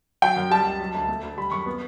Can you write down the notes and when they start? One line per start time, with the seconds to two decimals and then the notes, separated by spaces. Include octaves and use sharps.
0.22 F#3 G5
0.36 F#2
0.51 G3 A5
0.65 C#2
0.80 F#3
0.95 D2
1.09 A3
1.23 D2
1.37 G3 B5
1.51 F#2 C#6
1.66 B3